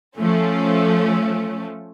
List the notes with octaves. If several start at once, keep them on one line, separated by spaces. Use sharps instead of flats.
F3 A3 C#4